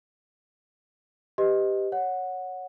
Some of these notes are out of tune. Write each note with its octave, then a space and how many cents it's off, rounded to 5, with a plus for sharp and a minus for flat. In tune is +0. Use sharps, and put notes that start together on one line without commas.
G4 +0 B4 +25 D#5 +0
C#5 +0 F#5 -10